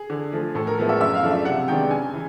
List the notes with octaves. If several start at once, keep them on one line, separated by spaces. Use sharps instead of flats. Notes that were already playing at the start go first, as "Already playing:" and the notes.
Already playing: G#4
D3
F3 A3
A2 A4
A#4
F3 G#3 B3 E4 A#4
E5
F#2 E5
F5
C#3 F3 A3 D4
E5
C3 F#5
D#3 G#3 B3 D4 G5
C#3 G#5
E3